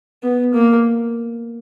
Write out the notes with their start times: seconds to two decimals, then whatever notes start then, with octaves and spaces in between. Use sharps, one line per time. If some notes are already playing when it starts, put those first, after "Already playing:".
0.23 B3
0.54 A#3